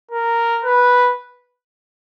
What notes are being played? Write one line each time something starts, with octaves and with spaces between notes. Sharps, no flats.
A#4
B4